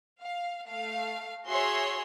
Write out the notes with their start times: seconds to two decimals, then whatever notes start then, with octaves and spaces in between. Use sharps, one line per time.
0.20 F5
0.67 A3 F5
1.48 F#4 G#4 C#5 E5 C6